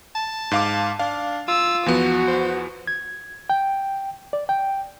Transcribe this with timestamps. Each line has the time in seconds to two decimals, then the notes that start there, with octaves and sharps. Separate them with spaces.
0.15 A5
0.51 G#2 F5 D6
0.99 D4 F5
1.48 F4 E6
1.86 E2 F3 B3 F#4
2.28 C5
2.87 G#6
3.50 G5
4.33 D5
4.49 G5